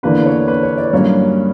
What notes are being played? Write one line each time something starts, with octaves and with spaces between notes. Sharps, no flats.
E2 D3 A#3 D4 B4
C#5
B4
C#5
D5
G2 F#3 A#3 C#4 C#5